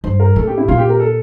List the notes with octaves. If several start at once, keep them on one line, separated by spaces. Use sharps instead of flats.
G2 C5
A#4
A2 A4
G4
E4
A#2 F4
G4
A#4
A4